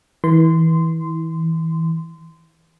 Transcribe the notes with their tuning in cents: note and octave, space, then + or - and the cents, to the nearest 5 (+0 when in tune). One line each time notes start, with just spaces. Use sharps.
E3 -25 C6 -20